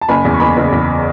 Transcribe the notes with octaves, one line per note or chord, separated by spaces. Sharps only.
A5
F#1 G#5 B5
E2
C#6
F#1 G#5 B5
F#1
E2